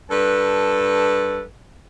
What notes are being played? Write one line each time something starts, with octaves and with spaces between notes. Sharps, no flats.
G2 A4 B4 A5